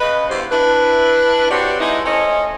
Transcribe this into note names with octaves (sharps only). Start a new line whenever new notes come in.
C#3 B4 D#5
E2 G2 C5
D4 E4 B4
C3 C4 F#4 G4 C#5 D5
G#3 D#4 E4
A3 C#4 A4 C5 C#5 D#5